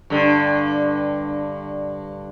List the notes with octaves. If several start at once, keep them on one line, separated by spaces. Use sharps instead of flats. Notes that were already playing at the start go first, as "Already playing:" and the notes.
G2 D3